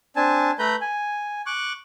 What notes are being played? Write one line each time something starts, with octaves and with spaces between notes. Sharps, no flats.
C4 D4 G#5 A5
A3 B4 A#5 B5 G6
G#5
C#6 D6 F#6